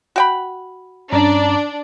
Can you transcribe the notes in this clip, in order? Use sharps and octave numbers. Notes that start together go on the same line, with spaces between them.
F#4 G5 B5
G2 C#4 D4 D5 A#5